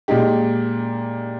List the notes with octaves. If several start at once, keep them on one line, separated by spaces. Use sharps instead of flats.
A#2 G#3 D#4 G4